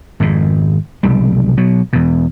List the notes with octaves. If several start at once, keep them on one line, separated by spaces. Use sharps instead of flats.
G#1 F2 G#2
F1 B1 G3
B2 F#3
E2 B2